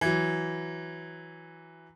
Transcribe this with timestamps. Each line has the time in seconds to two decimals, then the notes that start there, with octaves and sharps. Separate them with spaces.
0.01 E3 F#3